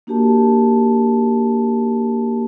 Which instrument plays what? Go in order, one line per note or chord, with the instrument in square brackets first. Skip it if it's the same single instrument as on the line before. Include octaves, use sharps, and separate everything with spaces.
[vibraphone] A#3 D4 F#4 G4 A#4 A5